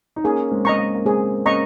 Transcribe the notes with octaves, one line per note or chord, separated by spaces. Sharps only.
D#4
A#3 C#4 G#4
G#3 C4
G#3 D#5 A#5 C#6
A#3
A#3
G#3 C4 G#4
A#3 C#4 D#5 A#5 C#6